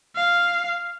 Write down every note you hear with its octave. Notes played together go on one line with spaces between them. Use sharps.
F5